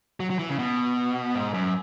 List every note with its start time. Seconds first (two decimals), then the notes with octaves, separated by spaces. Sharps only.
0.20 F#3
0.30 F#3
0.39 E3
0.49 C#3
0.59 B2
1.35 G#2
1.54 F#2